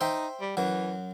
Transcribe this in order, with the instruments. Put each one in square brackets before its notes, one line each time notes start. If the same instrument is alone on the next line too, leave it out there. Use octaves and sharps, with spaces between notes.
[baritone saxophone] D#4 [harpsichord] C5 E5 G5
[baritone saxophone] G3
[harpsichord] F#2 F#3 [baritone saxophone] E3